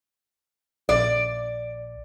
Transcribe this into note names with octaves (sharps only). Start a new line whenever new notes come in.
A#1 D5